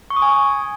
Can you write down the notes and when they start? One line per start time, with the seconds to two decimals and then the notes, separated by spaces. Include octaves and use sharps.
0.10 C#6
0.16 D#6
0.22 G#5